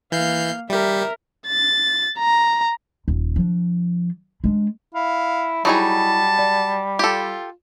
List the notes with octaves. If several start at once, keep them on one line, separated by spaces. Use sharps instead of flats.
E3 A#3 F5 G6 C7
G3 G4 A#4 E5
A6
A#5
D#1
F3 D4
G#3 D4
E4 F5
F#3 G3 D#4 E4 G#4 A5 B5 C#6
D5
F4 G4 A4